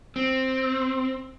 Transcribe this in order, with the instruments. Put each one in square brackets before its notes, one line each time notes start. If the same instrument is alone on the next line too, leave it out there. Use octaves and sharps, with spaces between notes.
[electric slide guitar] C4